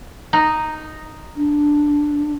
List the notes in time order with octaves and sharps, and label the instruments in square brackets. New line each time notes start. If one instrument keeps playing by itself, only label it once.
[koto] D#4
[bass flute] D4